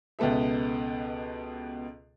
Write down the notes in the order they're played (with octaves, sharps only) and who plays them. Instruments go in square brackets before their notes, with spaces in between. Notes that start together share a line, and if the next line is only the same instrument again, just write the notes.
[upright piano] C#2 B2 B3 A4 E5